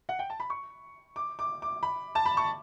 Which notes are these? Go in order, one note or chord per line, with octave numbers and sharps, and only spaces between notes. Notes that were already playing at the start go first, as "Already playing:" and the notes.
F#5
G5
A5
B5
C#6
D6
D6
D6
B5
A5
B5
C#6